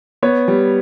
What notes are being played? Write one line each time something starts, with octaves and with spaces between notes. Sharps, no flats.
B3 C#5
G3